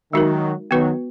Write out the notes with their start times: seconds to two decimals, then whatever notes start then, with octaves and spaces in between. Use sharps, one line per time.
0.13 D#3 F#3 G#3 D#4 F#4 A#4
0.71 D#3 F#3 B3 F#4 B4